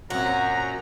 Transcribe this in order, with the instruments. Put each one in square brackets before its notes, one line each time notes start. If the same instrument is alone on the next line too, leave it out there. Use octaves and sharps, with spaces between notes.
[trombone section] F#2 [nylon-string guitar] A#2 C4 [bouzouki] F#4 [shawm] A#5